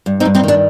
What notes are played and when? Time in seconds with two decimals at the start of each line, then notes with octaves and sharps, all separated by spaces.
0.06 G2
0.20 C4 D#4
0.25 G2
0.35 C4 D#4
0.44 D#3 D4